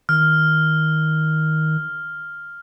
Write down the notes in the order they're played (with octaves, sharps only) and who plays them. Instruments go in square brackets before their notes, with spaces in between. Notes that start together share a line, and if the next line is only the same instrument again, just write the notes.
[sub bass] D#3 [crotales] F6